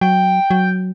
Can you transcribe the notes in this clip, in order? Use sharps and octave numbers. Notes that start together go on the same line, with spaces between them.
F#3 G5
F#3